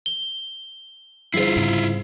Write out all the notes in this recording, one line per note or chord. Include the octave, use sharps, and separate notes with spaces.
G7
G1 E4 F4 G#4 C5 C7
G#2 C#3 C4